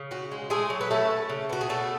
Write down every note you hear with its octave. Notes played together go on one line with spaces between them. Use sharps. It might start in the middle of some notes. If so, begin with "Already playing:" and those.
Already playing: C#3
C#4 F#4
G#3
G#3 A3 G#4
F#3
B4
A3 C#4 A4
A3
C#3
B3 F#4
G#4
C#3 A3 A4